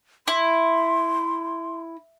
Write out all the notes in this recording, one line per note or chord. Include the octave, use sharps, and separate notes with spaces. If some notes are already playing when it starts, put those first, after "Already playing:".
E4 C6